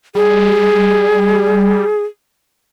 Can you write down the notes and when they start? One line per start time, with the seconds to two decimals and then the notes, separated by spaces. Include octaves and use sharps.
0.15 G3 G#4